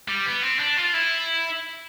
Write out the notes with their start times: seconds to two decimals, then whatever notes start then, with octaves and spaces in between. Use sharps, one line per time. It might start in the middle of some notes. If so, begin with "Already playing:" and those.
0.08 G3
0.26 B3
0.42 C4
0.59 D4
0.77 F4
0.94 E4